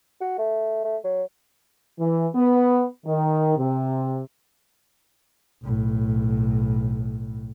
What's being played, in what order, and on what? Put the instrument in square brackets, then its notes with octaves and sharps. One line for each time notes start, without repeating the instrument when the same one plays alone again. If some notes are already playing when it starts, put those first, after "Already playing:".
[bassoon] F#4
A3
A3
F#3
[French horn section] E3
B3
D#3
C3
[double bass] B1 A2